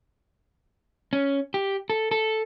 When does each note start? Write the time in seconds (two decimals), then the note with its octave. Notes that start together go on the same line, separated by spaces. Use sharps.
1.13 C#4
1.54 G4
1.90 A4
2.11 A4